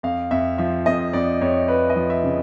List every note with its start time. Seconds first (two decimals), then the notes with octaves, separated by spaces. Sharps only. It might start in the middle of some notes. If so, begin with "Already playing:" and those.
0.03 F2 F5
0.31 F2 E5
0.58 F3 E5
0.86 F2 D#5
1.13 F2 D5
1.41 F2 C#5
1.68 F2 B4
1.90 D#5
1.96 F3
2.10 E5
2.24 C#3